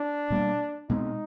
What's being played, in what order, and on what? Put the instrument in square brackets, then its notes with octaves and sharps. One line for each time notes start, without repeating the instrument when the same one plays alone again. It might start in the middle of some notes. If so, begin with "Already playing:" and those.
Already playing: [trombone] D4
[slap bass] B2 G3 A#3
[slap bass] B2 G#3 C4 [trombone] D#4